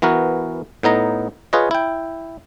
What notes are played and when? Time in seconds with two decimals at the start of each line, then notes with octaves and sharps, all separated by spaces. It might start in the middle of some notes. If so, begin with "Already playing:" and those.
0.02 E3 B3 F#4 A#4
0.83 A2 B3 D#4 A#5
1.53 F4 G#4 B4 C#5 D#5
1.71 E4 G5